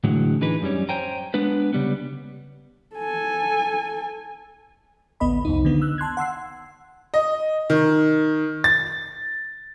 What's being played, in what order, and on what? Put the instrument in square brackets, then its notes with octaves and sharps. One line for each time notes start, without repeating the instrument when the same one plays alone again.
[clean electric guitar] A2 D3 E3 F#3 G#3
E3 D4 D#4 G#4 B4
F#2 G3 C#4
C5 C#5 G5 G#5 A#5
G#3 B3 D4 B4
C#3 G3 B3
[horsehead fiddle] A4 G#5
[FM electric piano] A1 D2 B3 D#5 B5
C2 F2 D#4
D3 D#3 B3
E6 F#6
A5 C6 F#6 G#6
F#5 C6 E6 C7
[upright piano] D#5
D#3
A6